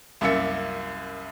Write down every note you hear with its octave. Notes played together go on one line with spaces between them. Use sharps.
C2 F#2 A#3 E5 A6 C#7